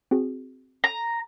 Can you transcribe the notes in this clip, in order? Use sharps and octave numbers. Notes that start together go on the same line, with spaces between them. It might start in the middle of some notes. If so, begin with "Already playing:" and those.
C4 F#4 G#4
A#5